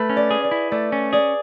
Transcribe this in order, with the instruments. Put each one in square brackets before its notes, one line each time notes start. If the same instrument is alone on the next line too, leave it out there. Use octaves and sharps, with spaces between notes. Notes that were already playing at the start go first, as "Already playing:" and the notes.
Already playing: [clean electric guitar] A3 [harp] B4
[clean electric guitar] C#4
[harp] D5
[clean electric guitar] G#4
[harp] D5
[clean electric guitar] E4
[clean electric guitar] A3 [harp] D5
[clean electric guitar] C#4
[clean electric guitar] G#4 [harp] D5